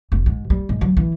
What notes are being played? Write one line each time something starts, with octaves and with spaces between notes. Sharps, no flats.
F1
G#2
G3
G#2
F#3
E3